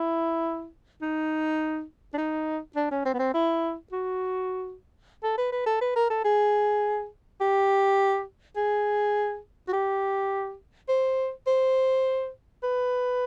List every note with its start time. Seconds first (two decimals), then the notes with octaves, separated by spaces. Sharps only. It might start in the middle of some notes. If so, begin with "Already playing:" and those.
Already playing: E4
1.02 D#4
2.14 D4
2.18 D#4
2.76 D4
2.91 C#4
3.05 C4
3.14 B3
3.19 C4
3.34 E4
3.92 F#4
5.23 A4
5.38 B4
5.52 B4
5.66 A4
5.81 B4
5.96 A#4
6.10 A4
6.25 G#4
7.41 G4
8.56 G#4
9.68 F#4
9.73 G4
10.89 C5
11.47 C5
12.63 B4